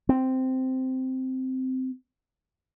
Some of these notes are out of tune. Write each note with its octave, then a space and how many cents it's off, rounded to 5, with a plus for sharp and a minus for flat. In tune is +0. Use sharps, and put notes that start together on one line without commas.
C4 -10